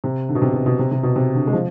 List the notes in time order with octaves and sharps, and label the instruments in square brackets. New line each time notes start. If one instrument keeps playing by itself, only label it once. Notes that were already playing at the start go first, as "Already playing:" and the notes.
[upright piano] C3
D3
B2
C3
B2
B2
C3
C3
B2
C3
D3
G#3
F3